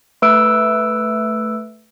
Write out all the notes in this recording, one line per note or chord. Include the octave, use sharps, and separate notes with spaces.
A3 B4 E6 D7